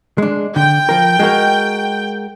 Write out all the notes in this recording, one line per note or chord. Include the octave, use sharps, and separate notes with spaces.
G#3 D4
D3 G5
F3 A#4
G#3 F#4 A#4